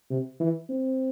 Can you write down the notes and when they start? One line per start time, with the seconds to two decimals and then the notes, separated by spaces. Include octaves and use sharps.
0.10 C3
0.40 E3
0.69 C4